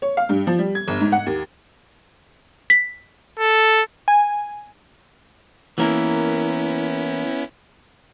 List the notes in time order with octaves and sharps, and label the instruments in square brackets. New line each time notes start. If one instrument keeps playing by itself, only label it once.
[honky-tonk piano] C#5
F5
G2
F3
G3
G#6
G1
G#2
F#5
D#2
[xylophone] B6
[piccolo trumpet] A4
[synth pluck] G#5
[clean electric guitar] E3 A#3 A#4 [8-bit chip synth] B3 C#4 E4